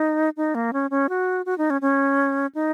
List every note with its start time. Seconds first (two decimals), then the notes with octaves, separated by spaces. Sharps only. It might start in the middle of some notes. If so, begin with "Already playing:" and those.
Already playing: D#4
0.37 D#4
0.55 A#3
0.73 C#4
0.91 C#4
1.09 F#4
1.46 F#4
1.58 D#4
1.70 C#4
1.81 C#4
2.55 D#4